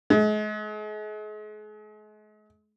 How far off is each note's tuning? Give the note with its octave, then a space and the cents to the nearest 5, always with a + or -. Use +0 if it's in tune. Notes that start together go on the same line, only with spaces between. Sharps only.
G#3 +40